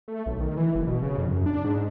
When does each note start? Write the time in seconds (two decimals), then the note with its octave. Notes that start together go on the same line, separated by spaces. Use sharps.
0.08 A3
0.26 B1
0.41 D#3
0.57 E3
0.75 F#1
0.87 B2
1.02 C#3
1.18 F2
1.30 F#2
1.46 D4
1.64 G#2